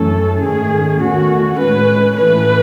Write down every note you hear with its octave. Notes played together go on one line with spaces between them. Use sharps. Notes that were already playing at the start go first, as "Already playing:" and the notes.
Already playing: F#2 E3 A3 C#4 A4
G#2 D#3 A3 C#4 G#4
E2 D#3 A3 C#4 F#4
A2 G#3 C#4 B4
A2 E3 A3 B4